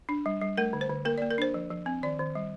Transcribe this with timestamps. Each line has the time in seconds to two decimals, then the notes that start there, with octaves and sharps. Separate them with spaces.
0.09 D4
0.26 G3
0.41 G3
0.58 A3 A#4
0.73 D3
0.81 C5
0.90 D3
1.05 A#3 A#4
1.18 A#3 D5
1.31 A#4
1.38 D4 C5
1.54 F3
1.70 F3
1.86 C4
2.03 D#3 D5
2.19 D#3
2.35 G3